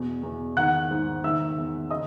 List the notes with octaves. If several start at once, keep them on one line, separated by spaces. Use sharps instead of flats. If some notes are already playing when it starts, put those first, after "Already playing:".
Already playing: E2 B2
E2
D#3 F#5 F#6
G#2
D#3 E5 E6
E2
C#3 D#5 D#6